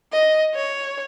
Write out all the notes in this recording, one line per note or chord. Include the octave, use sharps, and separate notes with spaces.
D#5
C#5